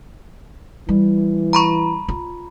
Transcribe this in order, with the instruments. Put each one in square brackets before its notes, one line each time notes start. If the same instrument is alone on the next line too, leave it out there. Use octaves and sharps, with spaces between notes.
[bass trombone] E3 [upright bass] G3
[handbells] A#5 B5 C#6
[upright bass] F4